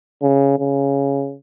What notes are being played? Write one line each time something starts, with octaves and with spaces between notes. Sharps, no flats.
C#3
C#3